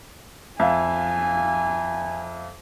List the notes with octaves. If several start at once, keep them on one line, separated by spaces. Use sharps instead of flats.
F2 E5 F5 G#5